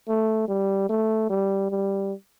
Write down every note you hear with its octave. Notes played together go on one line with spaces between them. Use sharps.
A3
G3
A3
G3
G3